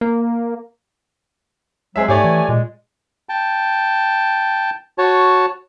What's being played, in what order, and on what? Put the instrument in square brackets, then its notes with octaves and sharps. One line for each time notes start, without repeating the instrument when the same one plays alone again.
[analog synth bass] A#3
[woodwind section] F#3 G#3 [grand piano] C4 G#4 E5
[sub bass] G#2 [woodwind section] A3 G#5 [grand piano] G4 C#5 D5
[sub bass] E3
[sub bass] A#2 [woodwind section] G#3
[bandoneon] G5 A5
F#4 C#5 A5